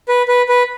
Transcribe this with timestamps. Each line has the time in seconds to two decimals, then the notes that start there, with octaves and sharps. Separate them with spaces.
0.08 B4
0.28 B4
0.49 B4